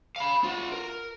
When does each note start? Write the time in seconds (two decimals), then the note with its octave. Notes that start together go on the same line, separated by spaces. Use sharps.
0.16 F5 B5
0.44 F4 F#5
0.72 A#4